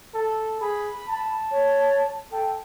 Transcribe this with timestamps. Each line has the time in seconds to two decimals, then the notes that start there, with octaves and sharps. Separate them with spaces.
0.15 A4
0.61 G#4 B5
1.08 A5
1.51 C#5
2.32 A4 G5